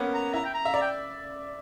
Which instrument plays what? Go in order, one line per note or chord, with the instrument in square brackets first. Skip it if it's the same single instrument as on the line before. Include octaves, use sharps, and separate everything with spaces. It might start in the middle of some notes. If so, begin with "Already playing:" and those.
Already playing: [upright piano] A#3 B3 C#4 A#4
[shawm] A#5
[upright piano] E4 [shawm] A#5
[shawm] G5
A#5
[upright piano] E5
[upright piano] D5 [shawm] A#5
[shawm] G5